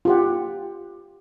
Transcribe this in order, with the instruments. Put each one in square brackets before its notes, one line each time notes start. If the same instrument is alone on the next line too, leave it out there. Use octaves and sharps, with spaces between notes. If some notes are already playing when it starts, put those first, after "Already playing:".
[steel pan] F4 G4 F#5